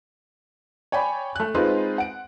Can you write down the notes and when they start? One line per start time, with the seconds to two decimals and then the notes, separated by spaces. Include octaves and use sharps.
0.92 C#5 D5 G5 G#5 B5
1.36 A3 F#6
1.55 G#3 C4 D#4 F4 B4
1.98 F#5 D7